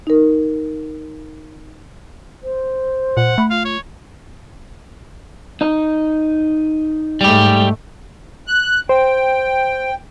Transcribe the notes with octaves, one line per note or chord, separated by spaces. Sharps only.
D#4 A#4
C5
A#2 F#5
A3 B5
F4 F5
C#5
D#4 D#5
G#2 G3 A3 G4
F#6
C5 G5